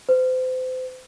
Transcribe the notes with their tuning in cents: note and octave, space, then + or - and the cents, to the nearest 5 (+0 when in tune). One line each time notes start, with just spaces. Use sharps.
C5 -35